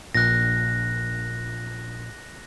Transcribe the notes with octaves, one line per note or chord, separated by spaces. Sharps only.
A#1 A#2 F#6 A#6